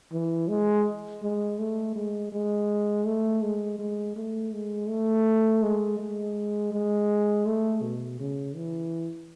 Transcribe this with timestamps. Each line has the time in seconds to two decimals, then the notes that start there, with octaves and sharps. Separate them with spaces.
0.13 E3
0.48 G#3
1.22 G#3
1.59 A3
1.96 G#3
2.32 G#3
3.06 A3
3.42 G#3
3.79 G#3
4.16 A3
4.53 G#3
4.89 A3
5.63 G#3
5.99 G#3
6.73 G#3
7.46 A3
7.83 B2
8.20 C#3
8.56 E3